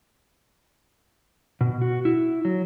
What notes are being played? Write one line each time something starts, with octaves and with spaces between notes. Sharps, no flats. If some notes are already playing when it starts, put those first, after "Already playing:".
B2
F#4
E4
F#3